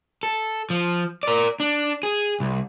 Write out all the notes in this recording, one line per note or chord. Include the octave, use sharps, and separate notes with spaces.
A4
F3
A#4 D5
D4
G#4
C2